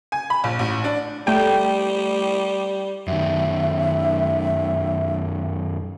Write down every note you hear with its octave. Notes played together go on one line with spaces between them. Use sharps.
G#5
B5
A#1
A1
D4
G3 A3 G5
F#2 D#3 E5